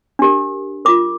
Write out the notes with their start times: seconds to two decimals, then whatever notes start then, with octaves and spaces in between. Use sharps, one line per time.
0.19 D4 G4 A#4
0.85 F4 A#4 D6